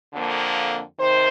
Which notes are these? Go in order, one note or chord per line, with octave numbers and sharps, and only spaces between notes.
F2 D3 F3 A#3
C3 D#3 C5